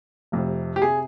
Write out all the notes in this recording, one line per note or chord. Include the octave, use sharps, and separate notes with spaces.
F1 F2 C3
G4
C3 G#4